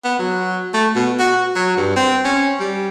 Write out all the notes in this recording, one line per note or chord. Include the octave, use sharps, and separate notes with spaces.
B3
F#3
A3
B2
F#4
F#3
G2
C4
C#4
G3